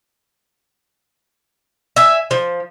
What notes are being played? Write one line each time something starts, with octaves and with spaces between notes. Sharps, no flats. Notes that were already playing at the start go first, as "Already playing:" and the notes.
E5 G#5
F3